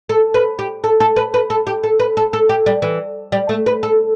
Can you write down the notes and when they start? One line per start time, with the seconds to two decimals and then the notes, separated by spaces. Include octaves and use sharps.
0.09 A4
0.34 B4
0.59 G4
0.84 A4
1.00 A4
1.16 B4
1.34 B4
1.50 A4
1.67 G4
1.84 A4
1.99 B4
2.17 A4
2.33 A4
2.49 G4
2.66 G3
2.82 E3
3.32 G3
3.49 A3
3.66 B4
3.83 A4